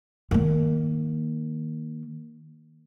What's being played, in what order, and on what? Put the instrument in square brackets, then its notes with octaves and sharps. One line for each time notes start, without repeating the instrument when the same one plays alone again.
[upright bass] D#3 A#3